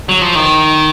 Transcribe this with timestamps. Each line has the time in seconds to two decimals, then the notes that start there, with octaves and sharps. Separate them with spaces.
0.09 F#3
0.21 F3
0.35 D#3